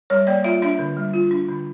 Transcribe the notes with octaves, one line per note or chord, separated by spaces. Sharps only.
G3 C#5
A#3 D5
F4 E5
D4 E5
D3
G3
F4
D4
D3